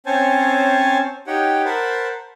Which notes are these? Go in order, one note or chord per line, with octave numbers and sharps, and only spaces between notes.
C4 C#4 C5 C#5 G#5 A5
D#4 G4 C#5 F#5 G5
A#4 C5 F#5 A5 B5